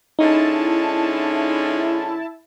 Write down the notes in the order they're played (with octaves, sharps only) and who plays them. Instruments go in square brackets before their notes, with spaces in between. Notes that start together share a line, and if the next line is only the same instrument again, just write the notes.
[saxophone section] D3 G#3 C#4 [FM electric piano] D#4 [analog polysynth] E4 A5